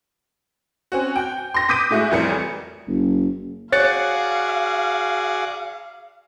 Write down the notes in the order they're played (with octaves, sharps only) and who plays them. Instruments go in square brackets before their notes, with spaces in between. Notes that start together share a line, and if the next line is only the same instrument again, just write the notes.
[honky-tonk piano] C4 C#4 F#4
G5
C6 A#6
D6 D#6 G6 B6 D7 D#7
A2 G#3 E4 F#4
A1 F2 E3 G3 A#4 C#7
[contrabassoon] F#1
[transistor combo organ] F#4 G#4 D5 [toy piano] C#5 [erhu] F5 [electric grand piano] F#6 A6 C#7